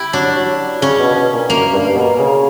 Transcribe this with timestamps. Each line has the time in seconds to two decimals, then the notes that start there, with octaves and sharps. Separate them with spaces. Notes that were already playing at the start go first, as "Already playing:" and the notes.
Already playing: E4 G4
0.13 F#3 D4
0.36 F#3
0.81 C#3 C#4
0.99 B2
1.15 B2
1.33 A#2
1.50 F#2 A#3
1.73 G2
1.95 B2
2.18 C#3